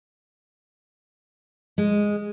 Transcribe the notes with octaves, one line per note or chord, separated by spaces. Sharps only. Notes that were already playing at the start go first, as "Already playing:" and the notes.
G#3